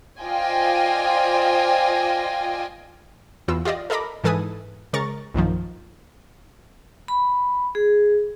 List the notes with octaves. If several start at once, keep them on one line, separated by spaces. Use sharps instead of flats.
F4 C5 D5 D#5 G5 G#5
E2 E3 F4 E6
F4 G4 D5 D#5
A4 A#4 D#5 A#5 B5 D6
G#2 E3 A4 B4 G#5 D#6
C#3 G#3 A#4 C#6 A6
A#1 F#2 D#3 F3
B5
G#4